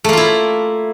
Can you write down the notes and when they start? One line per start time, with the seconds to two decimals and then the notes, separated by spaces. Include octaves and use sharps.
0.04 A3
0.09 A#3
0.13 F4
0.17 E4